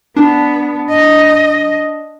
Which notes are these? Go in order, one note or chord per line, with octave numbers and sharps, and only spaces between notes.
B3 D4
D#5